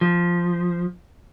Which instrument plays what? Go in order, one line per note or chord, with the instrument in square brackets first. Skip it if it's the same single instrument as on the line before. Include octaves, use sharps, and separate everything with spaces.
[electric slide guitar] F3